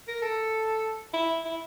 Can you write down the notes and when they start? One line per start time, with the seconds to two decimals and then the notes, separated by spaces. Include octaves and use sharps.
0.08 A#4
0.22 A4
1.14 E4
1.45 E4